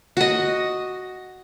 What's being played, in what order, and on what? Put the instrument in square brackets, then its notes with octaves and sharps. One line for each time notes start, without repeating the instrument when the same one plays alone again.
[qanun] F#4 D#5